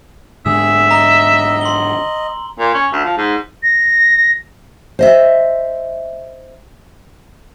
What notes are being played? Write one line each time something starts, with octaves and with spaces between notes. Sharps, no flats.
G#2 D3 G#4 E5 E6
D#5 A#5
C6 F#7 G7
A#2
C#4
D2
F3
G#2
A#6
C5 D#5 E5